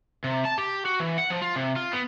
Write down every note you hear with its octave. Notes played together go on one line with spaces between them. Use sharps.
C3
A5
G4
F#4
E3
F#5
F3
F4
C3
F4
B3